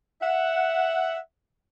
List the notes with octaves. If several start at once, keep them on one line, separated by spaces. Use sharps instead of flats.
E5 F#5